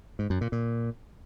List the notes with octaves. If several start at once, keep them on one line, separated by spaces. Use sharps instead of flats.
G#2
F#2
A#2
A#2